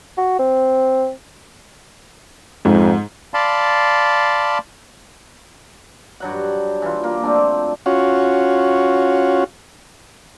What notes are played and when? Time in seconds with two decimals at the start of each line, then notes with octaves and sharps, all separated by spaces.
0.18 F#4
0.39 C4
2.65 F2 G#2
3.34 D5 F5 A5 B5 C6
6.20 G2 F#3 F#5
6.82 E3 F4
7.04 A#3 F4
7.23 F3 A3 C4 D4
7.86 C#4 F4 F#4